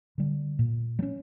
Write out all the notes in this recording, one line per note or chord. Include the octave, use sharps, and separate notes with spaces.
D3 G3
A#2
G3
C#4